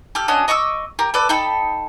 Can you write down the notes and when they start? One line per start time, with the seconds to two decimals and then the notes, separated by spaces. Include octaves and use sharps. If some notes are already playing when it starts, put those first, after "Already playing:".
0.15 G4 A4 F6
0.28 C#4 D4 F#4 D#5
0.48 D#5 C#6 D6 E6
0.99 G4 A#4
1.14 A4 B4 D5
1.29 D#4 A4 G5 B5